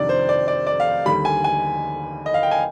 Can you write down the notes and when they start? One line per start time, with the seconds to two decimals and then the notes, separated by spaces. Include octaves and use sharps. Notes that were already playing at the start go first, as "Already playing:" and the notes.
Already playing: F2 C3 D#3 G3 D4 D5
0.09 C5
0.29 D5
0.48 D5
0.67 D5
0.80 F5
1.06 D#2 D3 G3 B5
1.25 G#5
1.44 G#5
2.26 D#5
2.34 F5
2.43 G5
2.51 G#5